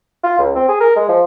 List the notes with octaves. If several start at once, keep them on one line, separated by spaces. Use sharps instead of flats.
F4
C#2
C4
G#4
A#4
G#3
F3